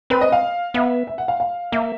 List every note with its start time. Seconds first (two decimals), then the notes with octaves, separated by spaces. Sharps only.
0.10 C4 B4
0.21 D#5
0.32 F5
0.74 B3 E5
1.07 E5
1.18 F#5
1.28 F5
1.40 F5
1.72 A#3 E5